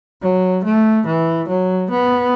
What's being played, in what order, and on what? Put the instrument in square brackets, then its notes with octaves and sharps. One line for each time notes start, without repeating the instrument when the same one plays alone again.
[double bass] F#3
A3
E3
F#3
B3